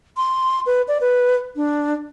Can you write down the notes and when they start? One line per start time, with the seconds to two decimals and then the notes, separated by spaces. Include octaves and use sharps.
0.17 C6
0.66 B4
0.88 D5
1.01 B4
1.56 D4